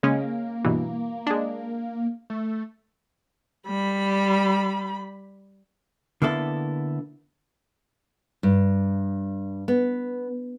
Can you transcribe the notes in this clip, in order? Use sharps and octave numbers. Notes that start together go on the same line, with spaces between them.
C#3 G#3 A#3 C#4
G2 B2 E3
G#3 D4
A3
G3 B5
D3 A#3 B3 E4 A4
G2
B3